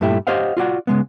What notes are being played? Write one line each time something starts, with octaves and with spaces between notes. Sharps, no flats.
G2 A#2 A3 E4 G4
G4 C5 C#5 D#5 F5 F#5
F4 F#4 D5 F#5
C#3 G#3 B3